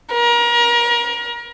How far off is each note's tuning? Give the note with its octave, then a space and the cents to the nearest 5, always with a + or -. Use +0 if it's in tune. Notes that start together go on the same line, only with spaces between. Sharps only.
A#4 +30